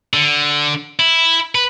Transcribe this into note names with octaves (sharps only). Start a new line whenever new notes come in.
D3
E4
B4